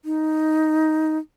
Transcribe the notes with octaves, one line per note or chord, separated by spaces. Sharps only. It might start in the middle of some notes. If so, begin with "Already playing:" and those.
D#4